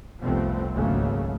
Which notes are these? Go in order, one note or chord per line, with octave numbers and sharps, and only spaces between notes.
F1 C2 F3 A3 B3 C4
G#1 C#2 C#3 F#3 A3 A#3